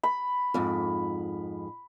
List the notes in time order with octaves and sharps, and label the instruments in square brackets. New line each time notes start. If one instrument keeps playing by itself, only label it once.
[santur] B5
[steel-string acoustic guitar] F2 G#2